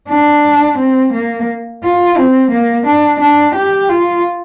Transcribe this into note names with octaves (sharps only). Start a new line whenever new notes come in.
D4
C4
A#3
F4
C4
A#3
D4
D4
G4
F4